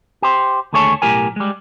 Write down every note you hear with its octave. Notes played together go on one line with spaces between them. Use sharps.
G4 C5
D#2 D3 A3 G#4 C#5 A5
B1 A2 G4 A#4 G#5
G3 G#3